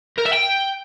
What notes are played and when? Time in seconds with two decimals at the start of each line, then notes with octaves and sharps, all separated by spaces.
0.18 A#4
0.26 E5
0.33 G5